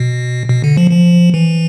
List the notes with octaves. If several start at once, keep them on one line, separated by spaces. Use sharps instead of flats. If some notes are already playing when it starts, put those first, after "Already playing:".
Already playing: B2
B2
D3
F3
F3
E3